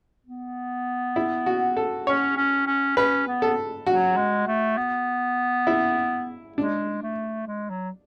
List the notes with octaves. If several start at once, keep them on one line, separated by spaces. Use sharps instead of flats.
B3
E4
F#4
A4
C#4 C#5
C#4
C#4
C#4 B4
B3
A4
F#3 F#4
G#3
A3
B3
E4
G#3 D4
A3
G#3
F#3